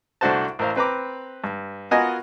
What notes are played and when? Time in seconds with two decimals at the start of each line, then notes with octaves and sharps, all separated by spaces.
0.21 C2 A3 D4 F#4 C5 A5
0.59 A1 A#4 C5 F5
0.76 C4 B4 A#5 D6
1.44 G2
1.91 B3 F4 F#4 A#4 D#5 G#5